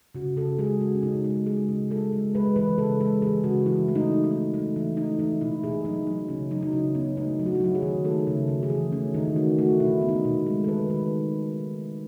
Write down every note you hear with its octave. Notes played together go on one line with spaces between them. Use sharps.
C#3 F#4
C#3 A4
G#3 G#4
G#3 F#4
C#4
C#3 D#4
G#3
G#3 G#4
C#3
G#3 A4
G#3
G#3 B4
E3 B4
C#3 A4
G#3 A4
E3 G#4
C#3 F#4
E3 E4
A3
D#4
E3
D#4
A3
A3 D#4
E3
A3 D#4
E3 D#4
B2 E4
B2 G#4
F#3 D#4
F#3 D#4
C#3 C#4
F#3 D#4
D#4
C#3 E4
B3 C#4
A3 D#4
F#3
F#4
E4
F#3 F#4
G#4
D#3
A3 A4
C#3
C#3
G#4
E3
A3 C#4
D#3 D#4
A3 F#4
A3 F#4
B2 E4
B3
D#4
B2
G#3
A4
D#3 B4
D#3 B4